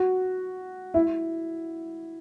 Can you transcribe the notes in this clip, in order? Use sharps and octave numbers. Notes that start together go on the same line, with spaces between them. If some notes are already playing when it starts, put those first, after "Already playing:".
Already playing: F#4
E4